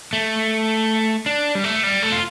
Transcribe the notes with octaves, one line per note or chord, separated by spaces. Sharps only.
A3
D4
G3
A3
G3
A3
F4